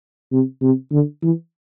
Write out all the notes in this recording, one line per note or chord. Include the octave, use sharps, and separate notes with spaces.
C3
C3
D3
E3